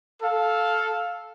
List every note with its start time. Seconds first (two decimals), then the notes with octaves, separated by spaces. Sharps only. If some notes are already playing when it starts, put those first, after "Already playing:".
0.22 A4 F5